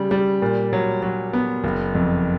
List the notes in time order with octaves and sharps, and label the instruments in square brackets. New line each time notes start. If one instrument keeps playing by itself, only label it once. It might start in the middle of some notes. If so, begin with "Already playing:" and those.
Already playing: [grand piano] C#3 G3
G3
A#2
F#3
F#3
B3
F#1
F2